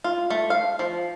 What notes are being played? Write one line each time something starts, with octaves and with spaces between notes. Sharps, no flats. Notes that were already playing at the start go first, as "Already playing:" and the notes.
F4
A3
F5
F3